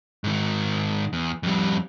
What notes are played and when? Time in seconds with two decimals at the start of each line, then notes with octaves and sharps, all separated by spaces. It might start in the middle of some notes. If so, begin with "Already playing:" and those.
0.24 G#2 D#3
1.13 E2
1.43 F2 G3